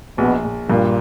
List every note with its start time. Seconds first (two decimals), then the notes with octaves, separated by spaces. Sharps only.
0.18 A#1 B2
0.44 A#1
0.69 G2 A#2